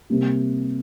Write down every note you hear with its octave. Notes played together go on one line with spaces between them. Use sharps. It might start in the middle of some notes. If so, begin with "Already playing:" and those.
C3 G3 A#3